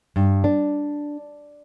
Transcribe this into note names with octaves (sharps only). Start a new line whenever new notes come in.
G2
D4